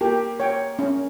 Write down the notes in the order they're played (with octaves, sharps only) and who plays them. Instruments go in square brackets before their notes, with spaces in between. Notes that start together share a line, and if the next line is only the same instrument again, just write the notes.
[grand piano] A#3 [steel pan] G4
[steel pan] C#5 G5
C#4